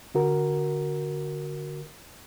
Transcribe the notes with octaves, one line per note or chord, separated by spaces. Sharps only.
D3 F#4 A#4